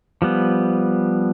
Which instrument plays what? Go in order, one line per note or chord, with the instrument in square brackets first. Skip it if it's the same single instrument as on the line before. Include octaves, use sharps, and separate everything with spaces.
[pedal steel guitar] F3 G3 B3